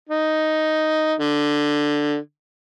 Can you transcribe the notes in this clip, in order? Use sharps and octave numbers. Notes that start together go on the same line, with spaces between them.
D#4
D3